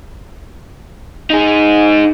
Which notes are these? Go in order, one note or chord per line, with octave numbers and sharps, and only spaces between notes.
D#4 G#4